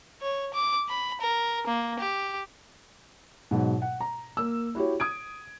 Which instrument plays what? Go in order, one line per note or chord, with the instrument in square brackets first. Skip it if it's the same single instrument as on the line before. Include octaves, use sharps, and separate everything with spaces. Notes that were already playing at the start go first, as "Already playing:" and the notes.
[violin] C#5
D6
B5
A#4
A#3
G4
[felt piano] G#2 B2 F#3
F#5
A#5
A#3 E6
E4 F#4 G4 C#5
D#6 G#6 D7